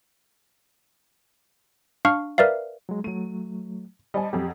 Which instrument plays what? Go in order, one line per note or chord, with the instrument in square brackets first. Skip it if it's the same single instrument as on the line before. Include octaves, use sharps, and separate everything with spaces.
[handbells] D4 F5 C#6 F6
A#4 B4 D5 E5 F5
[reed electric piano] F#3 G#3
[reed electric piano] F#3 A3 [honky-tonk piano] D#7
[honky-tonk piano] G3 C5 G#5 [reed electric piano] D#5 A5
[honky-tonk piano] F2 F#3 [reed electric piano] G4